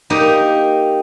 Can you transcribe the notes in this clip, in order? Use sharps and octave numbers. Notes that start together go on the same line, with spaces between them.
A#3 D#4 G4